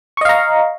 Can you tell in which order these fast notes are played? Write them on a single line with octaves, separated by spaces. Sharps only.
C#6 D#5 F5 A#5